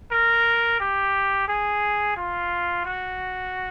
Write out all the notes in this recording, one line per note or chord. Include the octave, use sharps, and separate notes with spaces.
A#4
G4
G#4
F4
F#4